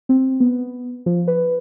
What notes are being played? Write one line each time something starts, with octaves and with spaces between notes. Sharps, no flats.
C4
B3
F3
B4